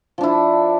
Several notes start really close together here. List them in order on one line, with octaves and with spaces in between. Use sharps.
F3 D4 E4